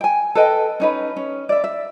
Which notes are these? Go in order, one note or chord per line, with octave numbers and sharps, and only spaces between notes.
G5 G#5
A4 B4 D#5 G5
C#4 D#4 B4
C#4
D5 E5
E5